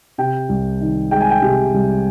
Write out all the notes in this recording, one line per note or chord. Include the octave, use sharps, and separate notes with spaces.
C3 G5
C2
D#3
G#3 G5
G#5
G5
C3
C2